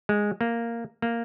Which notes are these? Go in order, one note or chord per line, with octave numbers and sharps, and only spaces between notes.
G#3
A#3
A#3